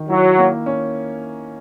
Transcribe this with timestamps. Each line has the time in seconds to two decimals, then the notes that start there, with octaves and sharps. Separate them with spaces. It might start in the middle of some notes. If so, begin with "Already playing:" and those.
Already playing: D#3
0.09 F#3 E4
0.38 A#3
0.66 C#4